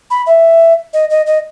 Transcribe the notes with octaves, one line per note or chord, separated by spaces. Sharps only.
B5
E5
D#5
D#5
D#5